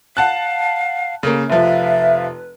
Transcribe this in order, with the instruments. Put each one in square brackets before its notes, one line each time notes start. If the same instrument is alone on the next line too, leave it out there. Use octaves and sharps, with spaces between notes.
[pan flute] F5 [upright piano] F#5 A5 F#6
[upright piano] C#3 A#3 [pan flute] A#4
[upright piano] F1 F3 [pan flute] B4 [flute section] E5 F5